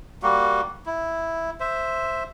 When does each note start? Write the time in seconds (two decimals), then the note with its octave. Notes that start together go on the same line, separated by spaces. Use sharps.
0.23 G3 A#3 F#4
0.86 E4
1.60 C5 E5